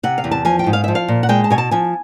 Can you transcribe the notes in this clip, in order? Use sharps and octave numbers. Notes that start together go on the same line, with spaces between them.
C3 F#5
F5
E2
A5
F3 G#5
G5
G#2
F5
F3 E5
F5
A#2
F#5
G#3 G5
A5
B2 G#5
A5
F3 G#5